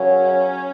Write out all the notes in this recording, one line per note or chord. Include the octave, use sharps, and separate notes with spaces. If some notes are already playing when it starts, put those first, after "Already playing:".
Already playing: F#2 C#3 F#3 C#4